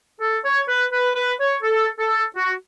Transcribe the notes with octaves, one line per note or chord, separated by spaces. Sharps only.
A4
C#5
B4
B4
B4
C#5
A4
A4
F#4